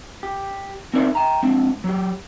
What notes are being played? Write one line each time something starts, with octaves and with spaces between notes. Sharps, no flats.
G4
C4 D#4 E4 A#4 D5 E5
G5 A#5
G#3 C4 D4
F#3 G4